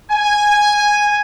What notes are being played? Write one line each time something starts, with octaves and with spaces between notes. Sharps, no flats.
G#5